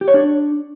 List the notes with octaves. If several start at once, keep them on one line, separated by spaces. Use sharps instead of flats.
G4
C#5
D4